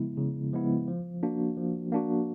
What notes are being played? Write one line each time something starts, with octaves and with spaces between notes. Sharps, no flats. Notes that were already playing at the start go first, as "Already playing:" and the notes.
Already playing: C#3 F3 G#3 B3 E4
C#3
F3 G#3 B3 E4
F3
A#3 D4 F#4
F3
A#3 D4 F#4